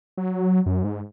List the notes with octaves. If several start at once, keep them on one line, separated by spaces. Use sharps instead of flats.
F#3
F#2
G#2